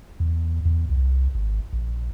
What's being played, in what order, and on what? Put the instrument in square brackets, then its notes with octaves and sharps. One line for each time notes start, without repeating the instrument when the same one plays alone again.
[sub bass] E2
E2
C2
G#1
A#1